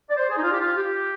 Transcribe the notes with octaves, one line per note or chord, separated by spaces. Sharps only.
D5
C5
G#4
D#4
F4
G4
F4
G4